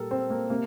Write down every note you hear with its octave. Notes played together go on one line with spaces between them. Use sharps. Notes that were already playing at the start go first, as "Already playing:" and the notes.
Already playing: A#2 G3 A4 A#4
C4
A#3
C3 A#3